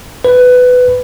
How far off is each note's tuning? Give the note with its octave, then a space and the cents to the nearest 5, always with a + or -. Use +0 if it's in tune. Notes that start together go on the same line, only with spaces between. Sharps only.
B4 +15